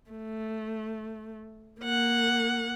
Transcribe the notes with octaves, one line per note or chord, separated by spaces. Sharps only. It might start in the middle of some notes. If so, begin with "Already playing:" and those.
A3
A#3 F#5